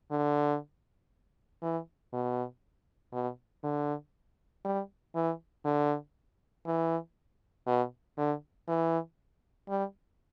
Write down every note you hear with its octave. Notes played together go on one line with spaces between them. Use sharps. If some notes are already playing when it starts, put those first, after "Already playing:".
D3
E3
B2
B2
D3
G3
E3
D3
E3
B2
D3
E3
G3